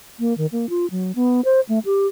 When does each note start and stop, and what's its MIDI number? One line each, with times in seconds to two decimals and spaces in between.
0.20 0.36 58
0.38 0.46 51
0.52 0.69 58
0.70 0.89 65
0.91 1.12 54
1.15 1.41 59
1.45 1.60 72
1.69 1.79 57
1.85 2.07 67